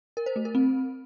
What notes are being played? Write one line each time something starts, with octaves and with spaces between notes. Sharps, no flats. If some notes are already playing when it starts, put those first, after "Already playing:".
A#4
C5
A3
A#4
C4